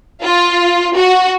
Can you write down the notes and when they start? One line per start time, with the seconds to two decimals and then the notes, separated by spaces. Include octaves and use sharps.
0.22 F4
0.95 F#4